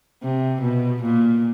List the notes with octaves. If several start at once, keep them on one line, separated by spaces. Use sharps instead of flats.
C3
B2
A#2